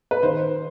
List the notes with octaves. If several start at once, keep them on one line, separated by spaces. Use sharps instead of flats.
B4
D#3 C5